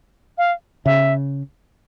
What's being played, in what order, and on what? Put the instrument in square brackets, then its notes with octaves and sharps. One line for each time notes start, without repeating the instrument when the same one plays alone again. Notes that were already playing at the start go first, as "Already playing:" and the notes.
[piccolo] F5
[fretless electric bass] C#3 [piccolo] E5